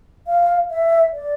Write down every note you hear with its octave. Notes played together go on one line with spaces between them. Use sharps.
F5
E5
D5